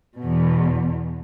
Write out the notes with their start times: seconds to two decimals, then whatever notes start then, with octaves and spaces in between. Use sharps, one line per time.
0.18 E2 B2